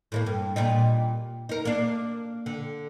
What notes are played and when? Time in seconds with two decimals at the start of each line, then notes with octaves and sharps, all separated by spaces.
0.12 A2 A3 A#3
0.26 G2
0.56 A#2 G3 D#4
1.49 D#4 A#4
1.65 A#3 D4
2.46 D3